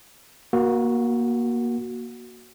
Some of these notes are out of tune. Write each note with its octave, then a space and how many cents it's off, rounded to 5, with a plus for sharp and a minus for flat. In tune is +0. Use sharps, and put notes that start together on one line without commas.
A#3 +25 F#4 +0